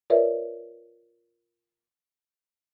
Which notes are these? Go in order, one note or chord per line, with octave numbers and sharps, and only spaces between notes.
F4 A#4 B4 C#5 D5 E5